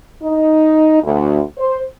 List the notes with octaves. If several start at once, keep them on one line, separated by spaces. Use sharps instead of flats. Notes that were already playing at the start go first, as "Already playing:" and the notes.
D#4
D2
C5